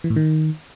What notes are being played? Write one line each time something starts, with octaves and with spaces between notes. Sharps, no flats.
E3
A2
D#3